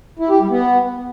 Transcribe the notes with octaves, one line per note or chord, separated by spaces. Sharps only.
E4
G4
G3
B3